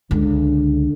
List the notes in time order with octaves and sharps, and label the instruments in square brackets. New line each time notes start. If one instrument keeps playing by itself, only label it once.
[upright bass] C#2 [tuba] D3